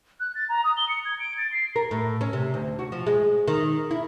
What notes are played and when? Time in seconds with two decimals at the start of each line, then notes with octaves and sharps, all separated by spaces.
0.20 F#6
0.35 A6
0.49 A#5
0.64 D#6
0.77 G7
0.89 C#7
1.05 G#6
1.20 D7
1.38 A6
1.52 C7
1.76 A#4
1.91 A2
2.21 C#4
2.33 C3
2.54 D2
2.79 F#4
2.92 F3
3.07 G#3
3.48 D#3
3.91 E4